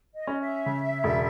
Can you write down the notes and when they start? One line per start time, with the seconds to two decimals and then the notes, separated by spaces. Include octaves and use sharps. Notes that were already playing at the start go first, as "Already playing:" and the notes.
0.15 D#5
0.27 C#4
0.41 E5
0.66 C#3
1.04 E1